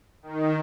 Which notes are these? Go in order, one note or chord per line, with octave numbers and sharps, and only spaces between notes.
D#3